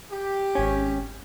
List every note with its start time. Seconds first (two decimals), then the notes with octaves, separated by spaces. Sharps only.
0.11 G4
0.55 G#1 C#4